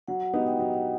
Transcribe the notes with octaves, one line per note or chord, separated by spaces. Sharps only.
F#3 F#5
F#5
B3 D#4 G4 D#5
G5
F#3 F#5